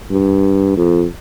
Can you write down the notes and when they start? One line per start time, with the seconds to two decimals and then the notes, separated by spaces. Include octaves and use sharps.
0.10 G2
0.77 F2